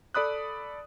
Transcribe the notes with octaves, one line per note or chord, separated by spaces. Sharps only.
A4 D5 B5 D#6 F#6